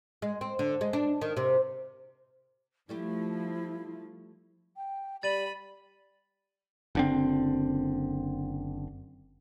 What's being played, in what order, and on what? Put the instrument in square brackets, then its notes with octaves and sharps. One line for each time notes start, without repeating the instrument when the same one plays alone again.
[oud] G#3
C4
D3
G#3
D4
D#3
C3
[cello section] F3 [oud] G3 A3 G4 [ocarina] E4
[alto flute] G5
[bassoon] G3 [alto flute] D5 [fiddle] B5 [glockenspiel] A6 D#7 F#7
[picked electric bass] F#1 D3 C4